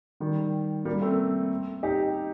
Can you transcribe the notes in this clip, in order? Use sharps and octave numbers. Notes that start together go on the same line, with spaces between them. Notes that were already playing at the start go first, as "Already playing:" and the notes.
D#3 G3
G3 A#3
A3 C4
D#4 G4